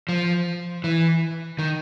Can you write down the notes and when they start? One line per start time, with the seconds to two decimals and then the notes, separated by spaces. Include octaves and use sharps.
0.09 F3
0.84 E3
1.59 D#3